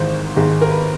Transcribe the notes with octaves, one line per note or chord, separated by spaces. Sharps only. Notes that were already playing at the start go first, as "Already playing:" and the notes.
Already playing: G#1 G#2 E3 G#3 C5
G#1 G#2 D#3 G#3
A#4
B4